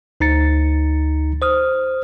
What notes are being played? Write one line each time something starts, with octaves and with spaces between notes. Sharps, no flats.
D2 D#4 A#5 A6 C#7
C5 D#6 F6